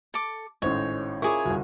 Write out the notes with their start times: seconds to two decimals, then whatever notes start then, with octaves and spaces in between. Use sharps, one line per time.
0.14 A4 D6
0.62 G#1 A2 C#4 C5 C#5 D#5
1.22 E4 F4 G#4 A#4 C#5 C#6 D6
1.45 G1 C2 F#4